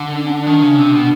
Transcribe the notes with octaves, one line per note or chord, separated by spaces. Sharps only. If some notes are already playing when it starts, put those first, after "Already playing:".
Already playing: D3
D4
C#4
D4
D#3
C#3
C3
B2